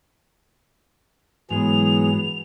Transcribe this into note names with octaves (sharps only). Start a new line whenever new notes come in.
G#2 E3 F#3 G#3 B3 G#4 F7